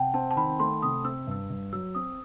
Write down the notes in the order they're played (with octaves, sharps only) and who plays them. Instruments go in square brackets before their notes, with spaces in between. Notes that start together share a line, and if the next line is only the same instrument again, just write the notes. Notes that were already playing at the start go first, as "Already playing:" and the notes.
Already playing: [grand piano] C3 [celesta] F#5 G5 A5
[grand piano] C4 [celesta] A5
[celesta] A5
[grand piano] D#3 [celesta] B5
[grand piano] A3 [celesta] C6
[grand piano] C3 [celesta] D#6
[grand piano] C4 [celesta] E6
[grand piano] G2 [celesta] E6
[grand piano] G2
[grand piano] F#3 [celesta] E6
[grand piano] C4 [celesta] D#6